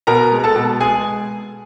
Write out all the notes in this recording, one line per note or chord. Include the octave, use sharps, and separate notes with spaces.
B2 A#4 A#5
G#3
A4 A5
B2
G#3 G#4 G#5